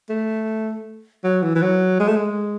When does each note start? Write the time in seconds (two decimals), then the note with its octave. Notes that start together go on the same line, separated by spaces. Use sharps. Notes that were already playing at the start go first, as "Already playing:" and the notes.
0.09 A3
1.24 F#3
1.42 E3
1.55 E3
1.62 F#3
2.00 G#3
2.08 A3
2.16 G#3